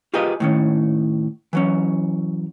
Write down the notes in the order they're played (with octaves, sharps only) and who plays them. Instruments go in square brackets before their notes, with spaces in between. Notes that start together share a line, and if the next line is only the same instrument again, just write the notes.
[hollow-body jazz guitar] F4 G4 G#4 A#4 B4 D#5
A2 D#3 C#4
E3 F#3 C#4